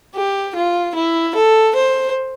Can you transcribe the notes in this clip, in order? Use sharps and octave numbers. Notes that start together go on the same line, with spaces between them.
G4
F4
E4
A4
C5